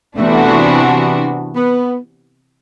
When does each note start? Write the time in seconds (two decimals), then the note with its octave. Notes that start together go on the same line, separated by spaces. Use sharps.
0.17 C3 E3 A3 B3 D4 F#4
1.56 B3